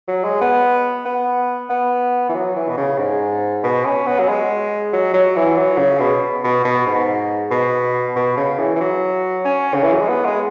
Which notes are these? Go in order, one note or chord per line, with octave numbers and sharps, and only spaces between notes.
F#3
G#3
B3
B3
B3
E3
F#3
E3
B2
C#3
G#2
B2
C#4
B3
F#3
G#3
F#3
F#3
E3
F#3
C#3
B2
B2
B2
G#2
B2
B2
C#3
E3
E3
F#3
C#4
C#3
E3
F#3
G#3
B3
G#3